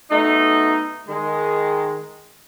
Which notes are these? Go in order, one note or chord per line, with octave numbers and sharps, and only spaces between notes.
B2 A3 D#4
D#3 G#3